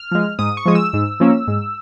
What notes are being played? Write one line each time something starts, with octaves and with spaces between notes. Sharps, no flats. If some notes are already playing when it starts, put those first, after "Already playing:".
Already playing: F6
F3 G#3
G#2 D#6
C#6
F3 G#3 D#6
E6
G#2
F3 A#3 C#4
G#2